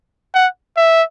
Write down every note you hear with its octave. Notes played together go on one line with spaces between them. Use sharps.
F#5
E5